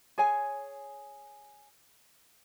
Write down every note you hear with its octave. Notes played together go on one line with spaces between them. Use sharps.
G#4 C#5 G#5